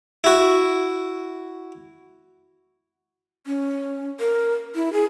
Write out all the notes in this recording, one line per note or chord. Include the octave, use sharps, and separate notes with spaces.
E4 F#4
C#4
A#4
E4
G#4